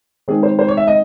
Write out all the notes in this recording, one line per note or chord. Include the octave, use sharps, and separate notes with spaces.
D#3 G#3 C4 G#4
C5
C5
C#5
E5
D#5